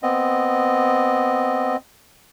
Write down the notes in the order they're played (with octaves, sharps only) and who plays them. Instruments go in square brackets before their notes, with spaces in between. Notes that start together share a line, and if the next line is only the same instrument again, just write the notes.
[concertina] B3 C4 D#5